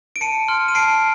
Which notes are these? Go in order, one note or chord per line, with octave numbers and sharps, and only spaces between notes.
D7
A5 C#7 D#7
C6 F6
D#7
A5 C7 D7